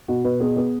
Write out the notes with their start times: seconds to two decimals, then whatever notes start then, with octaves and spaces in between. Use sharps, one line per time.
0.08 B2 F#4
0.24 B2 B4
0.40 B3 G#4
0.56 B3